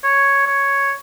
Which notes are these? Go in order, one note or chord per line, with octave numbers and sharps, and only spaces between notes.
C#5
C#5